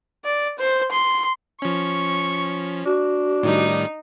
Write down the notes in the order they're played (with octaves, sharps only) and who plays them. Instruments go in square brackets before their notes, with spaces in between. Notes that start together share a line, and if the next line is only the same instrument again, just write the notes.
[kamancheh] D5
C5
C6
[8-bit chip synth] F3 C#4 [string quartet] C#6
[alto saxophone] D4 [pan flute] F#4
[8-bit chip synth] A2 D#3 G3 [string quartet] D#4